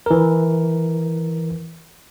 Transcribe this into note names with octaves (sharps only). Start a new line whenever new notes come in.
E3 A#4